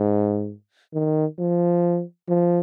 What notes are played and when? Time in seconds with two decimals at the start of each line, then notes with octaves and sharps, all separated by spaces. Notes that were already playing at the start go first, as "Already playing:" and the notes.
Already playing: G#2
0.93 D#3
1.38 F3
2.28 F3